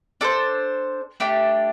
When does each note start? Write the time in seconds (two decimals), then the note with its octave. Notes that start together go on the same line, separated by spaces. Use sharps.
0.21 D4 A4 C5
1.20 A3 D4 G4